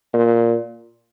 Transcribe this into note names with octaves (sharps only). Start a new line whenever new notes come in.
A#2